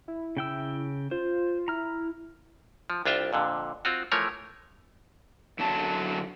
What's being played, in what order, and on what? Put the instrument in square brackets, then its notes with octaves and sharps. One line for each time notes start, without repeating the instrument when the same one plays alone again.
[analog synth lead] E4
[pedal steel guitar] C#3 G5 E6
[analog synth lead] F4 [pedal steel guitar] C5
[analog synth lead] E4 [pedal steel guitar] A#5 F6
[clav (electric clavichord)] F3
C2 D4 F4 E5 G5
F2 A#2 D3
C4 F4 F#4
E3 F3 A3 A#4 C#5
[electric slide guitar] F#2 D3 F#3 A5